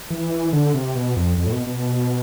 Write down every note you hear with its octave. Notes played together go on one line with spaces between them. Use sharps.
E3
D3
C3
B2
F2
F2
A2
B2
B2